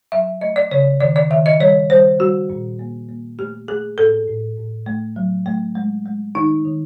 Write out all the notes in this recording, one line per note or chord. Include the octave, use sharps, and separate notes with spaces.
F#3 E5
A3 D#5
D5
C#3 C#5
D#3 D5
D5
D#3 E5
D#5
G3 C#5
G3 C5
G3 F#4
A#2
A#3
A#3
A3 G4
A3 G#4
A2 A4
A2
A2
A3
F#3
A3
G#3
G#3
D#3 D#4
D#3